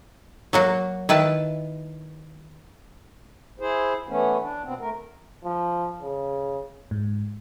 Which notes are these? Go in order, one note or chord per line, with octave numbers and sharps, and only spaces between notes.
F#3 A#3 F#4
D#3 E4 B4 A5
E4 G#4 C5
E3 A3 B3 C#4
D4
B2 B3 C4
A3 A#4
F3
C#3
G#2